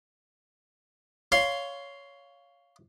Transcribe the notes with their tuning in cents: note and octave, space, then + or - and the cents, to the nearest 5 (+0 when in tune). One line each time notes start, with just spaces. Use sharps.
C#5 +15 F5 +0 C6 +0